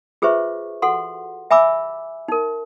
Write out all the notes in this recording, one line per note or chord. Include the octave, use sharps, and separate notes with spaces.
F4 G#4 B4 C5 E5 C#6
F#4 A4 F#5 C6
E5 G#5 B5 D6 E6
D#4 A#4